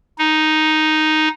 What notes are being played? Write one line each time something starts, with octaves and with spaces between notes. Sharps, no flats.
D#4